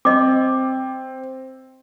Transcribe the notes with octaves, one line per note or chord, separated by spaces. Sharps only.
C4 D#5 D6